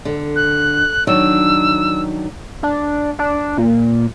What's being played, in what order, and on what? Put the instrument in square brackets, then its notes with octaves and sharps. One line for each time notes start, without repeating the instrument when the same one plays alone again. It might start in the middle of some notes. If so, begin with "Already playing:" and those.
[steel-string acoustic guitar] D3
[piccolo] F#6
[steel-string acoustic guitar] D#3 F#3 D4 [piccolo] E6
[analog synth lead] D4
D4
A#2